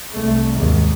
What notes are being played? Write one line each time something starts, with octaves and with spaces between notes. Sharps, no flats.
C2 A3
D#2 G#2